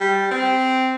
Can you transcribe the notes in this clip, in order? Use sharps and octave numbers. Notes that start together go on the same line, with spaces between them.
G3
C4